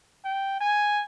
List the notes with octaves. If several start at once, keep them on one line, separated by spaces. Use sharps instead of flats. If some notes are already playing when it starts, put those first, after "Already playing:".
G5
G#5